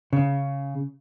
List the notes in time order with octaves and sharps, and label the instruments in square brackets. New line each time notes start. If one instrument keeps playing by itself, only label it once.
[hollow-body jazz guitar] C#3